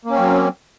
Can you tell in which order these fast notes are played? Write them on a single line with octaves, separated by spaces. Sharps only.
A#3 C#4 C4 F#3